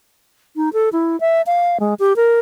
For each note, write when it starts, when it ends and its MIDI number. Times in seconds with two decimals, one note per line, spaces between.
0.56 0.70 63
0.73 0.89 69
0.93 1.19 64
1.20 1.42 76
1.46 1.78 77
1.80 1.94 56
1.99 2.16 67
2.16 2.40 70